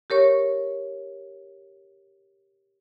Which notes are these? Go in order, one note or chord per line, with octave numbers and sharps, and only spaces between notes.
G4 A#4 C#5 C#6